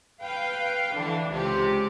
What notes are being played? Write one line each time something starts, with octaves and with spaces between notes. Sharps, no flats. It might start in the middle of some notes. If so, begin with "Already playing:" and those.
B4 F5 G5
D3 E3 D4
C#2 C3 G4